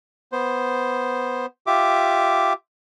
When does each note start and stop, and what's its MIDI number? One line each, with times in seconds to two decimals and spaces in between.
0.32 1.46 59
0.32 1.46 72
1.67 2.53 65
1.67 2.53 67
1.67 2.53 76
1.67 2.53 86